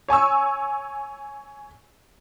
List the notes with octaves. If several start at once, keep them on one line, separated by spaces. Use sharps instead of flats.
C#5 G#5 C#6 E6